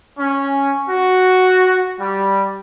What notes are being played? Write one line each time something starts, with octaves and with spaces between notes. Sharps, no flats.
C#4
F#4
G3